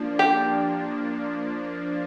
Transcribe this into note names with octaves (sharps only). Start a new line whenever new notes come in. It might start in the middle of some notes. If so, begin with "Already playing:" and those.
Already playing: F3 A#3 D4
G4